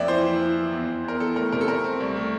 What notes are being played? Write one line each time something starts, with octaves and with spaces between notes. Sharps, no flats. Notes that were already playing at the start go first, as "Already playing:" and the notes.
Already playing: F2 A#3 D5 E5
E3 C5
E3
E3
E3
E2
E2
E2 A#4
E3 A4
A3 A#4
C3 A#4
A4
A3 A#4
C4
C2
A3